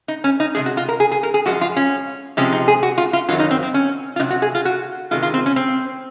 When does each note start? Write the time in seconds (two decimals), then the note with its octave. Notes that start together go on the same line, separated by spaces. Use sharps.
0.08 D#4
0.24 C#4
0.40 D#4
0.55 C3 F3 G#3 G#4
0.66 F#4
0.77 F4
0.89 A#4
1.00 G#4
1.11 G#4
1.23 A#4
1.34 G#4
1.45 F#2 F3 G#3 F#4
1.61 F4
1.76 C#4
2.37 C3 F3 G#3 C#4
2.52 D#4
2.68 G#4
2.83 F#4
2.98 F4
3.13 F4
3.29 F#2 D#3 F#3 F4
3.39 D#4
3.51 C4
3.63 C4
3.74 C#4
4.16 F4
4.20 C3 F#3 D#4
4.31 F#4
4.42 G#4
4.55 F4
4.65 F#4
5.11 C3 D#3 G#3 F4
5.22 F4
5.34 C4
5.46 C#4
5.56 C4